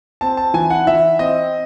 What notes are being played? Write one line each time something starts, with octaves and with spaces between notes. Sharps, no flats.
C4 A5
A5
E3 G#5
F#5
E3 E5
C4 D#5